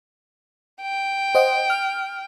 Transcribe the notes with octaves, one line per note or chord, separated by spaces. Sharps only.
G5
C5 D#5 F#5
F6